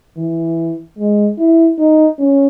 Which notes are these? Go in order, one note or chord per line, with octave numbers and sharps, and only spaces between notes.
E3
G#3
E4
D#4
C#4